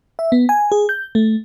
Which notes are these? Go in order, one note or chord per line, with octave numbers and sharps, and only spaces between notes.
E5
B3
G#5
G#4
G6
A3